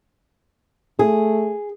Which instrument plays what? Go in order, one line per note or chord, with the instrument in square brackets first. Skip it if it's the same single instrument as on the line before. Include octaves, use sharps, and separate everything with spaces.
[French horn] A3 [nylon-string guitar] G#4